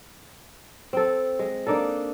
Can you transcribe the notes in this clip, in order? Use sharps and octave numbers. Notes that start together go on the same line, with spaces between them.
C4 A4
G#3
A#3 D4 D#4 A4